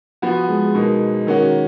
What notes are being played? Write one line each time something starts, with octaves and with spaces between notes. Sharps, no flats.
F3 B3 F#4
G#3
B2 A#3 D#4
D#3 A#3 C#4 F#4